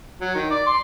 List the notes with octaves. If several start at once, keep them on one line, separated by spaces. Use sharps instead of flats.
F#3
D#3
D5
C6